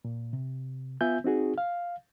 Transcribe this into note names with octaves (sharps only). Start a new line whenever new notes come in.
A#2
C3
B3 F4 E5 G#5 G6
C4 D#4 F#4 G#4
F5